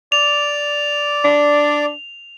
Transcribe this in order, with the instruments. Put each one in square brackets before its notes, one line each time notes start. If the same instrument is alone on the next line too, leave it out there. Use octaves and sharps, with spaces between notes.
[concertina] D5 D6 [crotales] F7
[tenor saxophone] D4